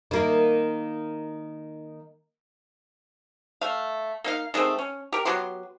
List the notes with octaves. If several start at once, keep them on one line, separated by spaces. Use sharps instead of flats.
D#3 A#3
A3 F5
A#3 D#4 F5
D#3 G#3 A3 C4
C#4
G4 A#4
F#3 B3 G4 C6